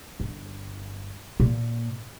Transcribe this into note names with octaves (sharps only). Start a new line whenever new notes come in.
G1
A#2